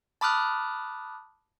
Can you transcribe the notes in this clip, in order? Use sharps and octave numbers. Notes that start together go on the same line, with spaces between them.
A5 B5 D6 D#6 F6 F#6